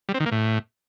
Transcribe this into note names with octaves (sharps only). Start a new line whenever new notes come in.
G3
C4
D#3
A#3
A2